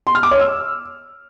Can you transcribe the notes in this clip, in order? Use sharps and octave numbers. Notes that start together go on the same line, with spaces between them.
C6
F6
D6
C#5
E6